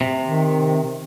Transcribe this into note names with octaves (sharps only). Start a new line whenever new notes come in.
C3
D#3